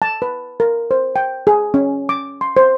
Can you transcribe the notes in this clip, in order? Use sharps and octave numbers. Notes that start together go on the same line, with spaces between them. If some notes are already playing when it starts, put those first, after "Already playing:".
A5
B4
A#4
C5
G5
G#4
C#4
D6
C6
C5